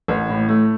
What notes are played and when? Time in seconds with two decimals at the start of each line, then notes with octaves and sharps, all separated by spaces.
0.08 A1
0.29 A2
0.49 A3